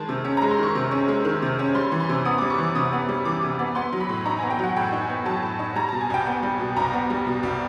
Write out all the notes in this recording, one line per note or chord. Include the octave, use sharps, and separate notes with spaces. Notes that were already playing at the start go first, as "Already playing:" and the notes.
Already playing: D#3 G#3 A5
C3
C#4
G#3 A#5
C6
D#3 C#6
C3
C#4
G#3
D#3
C3
C#4
G3 C6
E3
C6
C3
B3 D#6
G3 D6
C#6
E3 D6
C3 D#6
B3
G3
E3 D6
C3
B3
B3 C6
F#3
B5
A2
D#4 A#5
B3 G#5
G5
F#3 F#5
A2 G5
D#4
G#5
B3
F#3 A5
A2
D#4
G3 A#5
B2 A5
G#5
C2 G5
B3
G3
B2
C2 A#5
B3
G3
B2
C2